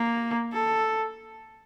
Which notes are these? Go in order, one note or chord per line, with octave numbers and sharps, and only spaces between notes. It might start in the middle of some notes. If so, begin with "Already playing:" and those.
Already playing: A#3
A4